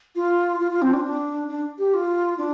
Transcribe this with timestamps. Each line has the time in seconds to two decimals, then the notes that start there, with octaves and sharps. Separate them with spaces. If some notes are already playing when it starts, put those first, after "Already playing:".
0.15 F4
0.60 F4
0.71 F4
0.82 C4
0.93 D4
1.04 D4
1.49 D4
1.78 G4
1.94 F4
2.38 D4